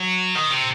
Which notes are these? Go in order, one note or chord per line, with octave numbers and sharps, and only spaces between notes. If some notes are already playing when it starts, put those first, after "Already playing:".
Already playing: F#3
D#3
C3